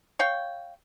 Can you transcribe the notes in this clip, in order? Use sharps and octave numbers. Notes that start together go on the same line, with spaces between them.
C#5 F5 G5